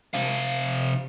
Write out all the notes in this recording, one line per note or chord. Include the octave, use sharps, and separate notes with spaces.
C3 F5